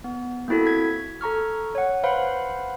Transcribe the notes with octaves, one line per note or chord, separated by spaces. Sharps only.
B3
A#3 C4 E4 F#4 A4
G#6 B6
A4 A#5 C#6 F6
C#5 F#5
B4 C5 F5 F#5 B5